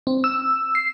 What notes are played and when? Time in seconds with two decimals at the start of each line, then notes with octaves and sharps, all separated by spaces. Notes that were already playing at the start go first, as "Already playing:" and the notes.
0.07 C4
0.24 E6
0.75 C7